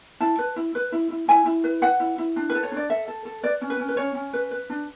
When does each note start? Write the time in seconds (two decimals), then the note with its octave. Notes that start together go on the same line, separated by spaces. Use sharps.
0.20 E4 A5
0.38 B4
0.56 E4
0.75 B4
0.92 E4
1.11 E4
1.28 E4 G#5
1.46 E4
1.64 B4
1.82 B4 F#5
2.00 E4
2.18 E4
2.36 D4
2.50 A4 B4
2.63 C#5
2.72 D4 D5
2.90 A4 E5
3.08 A4
3.25 A4
3.43 B4 D5
3.61 C#4
3.70 B4
3.79 C#4
3.88 B4
3.97 C#4 C#5
4.15 C#4
4.33 B4
4.51 B4
4.70 D4